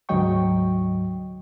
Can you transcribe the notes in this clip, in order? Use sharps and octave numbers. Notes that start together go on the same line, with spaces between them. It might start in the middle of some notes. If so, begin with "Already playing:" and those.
D2 G#2 F#3 D#5 G5 C#6